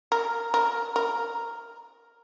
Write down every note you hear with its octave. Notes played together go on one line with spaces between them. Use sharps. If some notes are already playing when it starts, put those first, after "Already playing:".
A#4
A#4
A#4